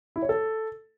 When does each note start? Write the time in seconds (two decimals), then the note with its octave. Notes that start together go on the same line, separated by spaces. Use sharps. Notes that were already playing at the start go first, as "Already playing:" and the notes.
0.16 E4
0.22 C#5
0.29 A4